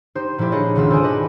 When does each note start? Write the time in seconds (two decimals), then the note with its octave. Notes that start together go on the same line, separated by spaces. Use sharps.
0.15 D#4 G4 C5
0.38 A#2 F3 A3 E4 G4
0.52 D4 D#4 G#4 A4 C#5 D#5
0.75 G#1 C#2 B2 F4 E6
0.90 A4 C5 D5 G#5 D#6 F#6
1.03 G4 B4 D#5 A5 D6